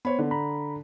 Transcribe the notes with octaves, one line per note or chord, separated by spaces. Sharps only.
B3 C5 C#5 B5
D3
A#5 B5